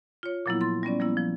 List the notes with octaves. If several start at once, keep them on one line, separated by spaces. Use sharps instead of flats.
F4 C#5
A#2 F3 F#3 A#3 B3 E4
C6 A6
G3 B3 C#4 D5
F3 G3 A#3 B3 E4
F3